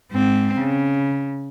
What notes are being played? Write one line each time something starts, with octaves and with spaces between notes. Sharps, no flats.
G#2 C4
C#3